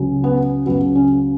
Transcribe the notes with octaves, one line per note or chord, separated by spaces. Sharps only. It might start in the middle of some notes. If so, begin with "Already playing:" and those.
Already playing: C#2 C#3 F#3
B3
C#2 C#3 F#3 B3
C#4